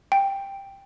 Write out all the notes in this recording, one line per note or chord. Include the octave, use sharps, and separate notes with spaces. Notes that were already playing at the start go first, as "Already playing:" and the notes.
G5